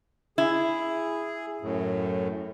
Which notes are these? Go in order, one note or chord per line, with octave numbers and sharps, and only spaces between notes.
E4 G#4
F#2 A2